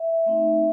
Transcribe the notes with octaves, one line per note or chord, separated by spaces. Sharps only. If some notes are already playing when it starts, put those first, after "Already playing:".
Already playing: E5
A3 C4 D#4